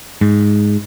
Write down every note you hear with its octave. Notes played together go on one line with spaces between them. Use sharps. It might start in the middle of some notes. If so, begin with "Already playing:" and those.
G#2